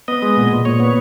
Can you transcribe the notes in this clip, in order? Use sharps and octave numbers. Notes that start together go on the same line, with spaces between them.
B3 D#5
G#3
A#2
A#2
A#2 C#5
B3